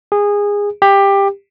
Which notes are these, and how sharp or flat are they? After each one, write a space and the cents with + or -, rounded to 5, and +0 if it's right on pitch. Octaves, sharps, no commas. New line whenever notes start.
G#4 -20
G4 +15